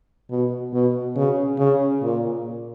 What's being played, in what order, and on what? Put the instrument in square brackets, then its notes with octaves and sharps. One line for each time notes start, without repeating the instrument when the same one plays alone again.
[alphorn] B2
B2
C#3
C#3
A#2